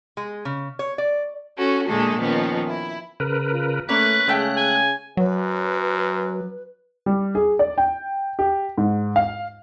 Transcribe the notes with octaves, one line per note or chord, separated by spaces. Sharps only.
G#3
C#3
C#5
D5
C#4 F#4 A4
A#2 D3 G#3 A3 A4
D#3 F3 B3 C#4
E4
C#3 A#4 B4
F4
A3 A#3 C#4 B4 C#5 F#6
C#3 G#3 A3 G5
G#5
F#2 F#3 B4
G3
G#4
D5
G5
G4
G#2
F5